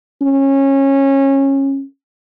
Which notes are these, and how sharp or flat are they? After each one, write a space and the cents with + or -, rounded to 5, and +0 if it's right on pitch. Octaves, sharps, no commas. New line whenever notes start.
C#4 -20